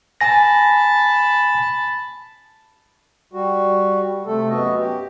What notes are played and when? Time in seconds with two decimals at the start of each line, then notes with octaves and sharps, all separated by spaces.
0.21 G#5 A5 B5 A#6
3.33 G3 F#4
4.26 C3 A3 A4
4.49 F#2 B3 F#4 D#5
4.80 G4